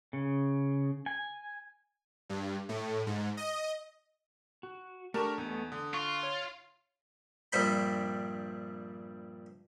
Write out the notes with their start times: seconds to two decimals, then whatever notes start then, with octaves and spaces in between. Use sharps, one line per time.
0.13 C#3
1.06 G#5
2.29 G2
2.69 A2
3.06 G#2
3.37 D#5
4.63 F#4
5.14 A3 D4 G4 A#4 A5 C#6
5.38 E2 A3 B3 D#4
5.72 D3 D#6
5.94 F4 F5 C#6
6.23 C#5 F6
7.52 A#1 G2 G3 C4 G5 B5